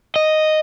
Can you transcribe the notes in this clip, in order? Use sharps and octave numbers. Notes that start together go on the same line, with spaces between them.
D#5